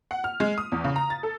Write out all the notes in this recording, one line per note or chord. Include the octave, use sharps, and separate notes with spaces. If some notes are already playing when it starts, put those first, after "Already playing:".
F#5
F6
G#3
D#6
E2
C#3
A#5
A6
A4